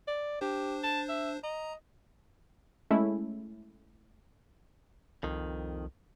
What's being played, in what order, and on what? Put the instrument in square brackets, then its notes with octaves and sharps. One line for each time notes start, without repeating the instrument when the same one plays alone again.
[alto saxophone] D5
[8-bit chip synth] D4 C5 [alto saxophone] G4
[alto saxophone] A5
E5
[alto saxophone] D#5 [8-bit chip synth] A#5
[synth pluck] G#3 A3 C#4 E4
[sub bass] C2 [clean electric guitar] F2 D#3